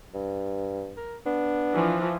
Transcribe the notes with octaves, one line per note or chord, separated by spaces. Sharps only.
G2
A#4
B3 D4
E3 F3